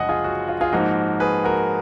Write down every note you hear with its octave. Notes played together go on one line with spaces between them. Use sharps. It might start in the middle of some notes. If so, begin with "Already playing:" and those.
Already playing: F#1 F#2 D3 F3 G#3 D#5 F#5 G#5
F4 G#4
F#4
F4
F4 G#4
G#2 F3 A#3 D#4 F#4 A#4
G#4 B4
F#4 A#4